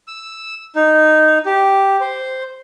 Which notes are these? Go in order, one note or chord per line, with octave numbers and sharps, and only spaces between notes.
E6
D#4
G4
C5